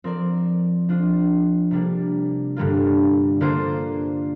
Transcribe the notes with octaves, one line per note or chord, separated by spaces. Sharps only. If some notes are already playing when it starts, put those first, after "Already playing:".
F3 C4 A#4 D5
F3 D4 F4 C5
C3 G3 A#3 D4
G2 D3 G3 A#3 F4
D3 A#3 D4 F4 C5